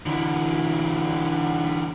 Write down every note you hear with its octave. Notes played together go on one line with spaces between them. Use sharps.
D3 E3